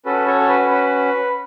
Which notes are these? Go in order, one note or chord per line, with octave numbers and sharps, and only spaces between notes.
C#4 F#4 A4 B4
A4 C#5
C#5
B4
B4